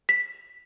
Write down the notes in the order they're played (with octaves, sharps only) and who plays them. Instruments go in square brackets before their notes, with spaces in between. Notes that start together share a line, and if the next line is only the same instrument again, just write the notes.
[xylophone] B6